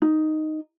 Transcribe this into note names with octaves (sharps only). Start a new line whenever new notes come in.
D#4